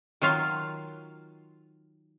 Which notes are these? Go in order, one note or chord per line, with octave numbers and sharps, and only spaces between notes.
D#3 F#3 F4 F5